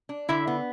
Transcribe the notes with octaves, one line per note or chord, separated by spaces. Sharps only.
D4
D3 E4 E5
B3